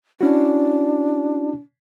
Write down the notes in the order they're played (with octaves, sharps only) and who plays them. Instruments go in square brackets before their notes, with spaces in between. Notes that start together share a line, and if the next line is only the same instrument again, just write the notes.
[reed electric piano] C#4 E4 F#4 [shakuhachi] D4